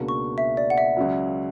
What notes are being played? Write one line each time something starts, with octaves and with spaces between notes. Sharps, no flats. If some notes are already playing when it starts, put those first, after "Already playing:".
Already playing: C#2 B2 A#3 D4 F#4
C#6
E5
D5
F#5
E5
C#2 C#3 F#3